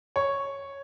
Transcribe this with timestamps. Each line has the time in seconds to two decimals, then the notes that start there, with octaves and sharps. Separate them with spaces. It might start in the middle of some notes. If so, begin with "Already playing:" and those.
0.16 C#5